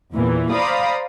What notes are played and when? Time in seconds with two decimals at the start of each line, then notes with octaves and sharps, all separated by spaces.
0.14 E2 A#2 E3
0.50 C5 D5 F5 A#5 B5 D#6